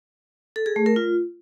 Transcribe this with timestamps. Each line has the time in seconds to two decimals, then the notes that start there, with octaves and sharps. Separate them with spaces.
0.56 A4
0.66 G#4
0.76 A3
0.86 A#4
0.96 F4